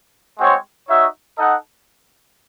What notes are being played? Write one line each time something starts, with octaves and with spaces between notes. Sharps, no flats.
G#3 C4 F#4 C#5
D#4 F#4 C#5 E5
D#4 A4 D#5 F#5